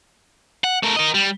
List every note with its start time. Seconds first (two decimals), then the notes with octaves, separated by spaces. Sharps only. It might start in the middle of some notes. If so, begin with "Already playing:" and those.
0.64 F#5
0.83 A3 A#4
0.96 A#4 D#5
1.14 G3